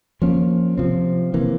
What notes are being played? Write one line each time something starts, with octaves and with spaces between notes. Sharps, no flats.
F3 A#3 C#4
C3 F3 C4
C3 E3 A#3